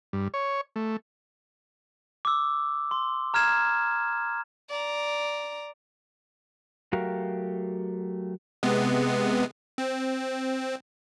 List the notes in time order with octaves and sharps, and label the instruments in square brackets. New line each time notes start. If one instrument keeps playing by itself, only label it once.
[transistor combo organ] G2
C#5
A3
[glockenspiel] D6 E6
C6
A#5 F6 G#6 E7
[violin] D5 A#5
[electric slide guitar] F#3 A3 F#4 G4 A#4 F5
[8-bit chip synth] C3 G#3 B3
C4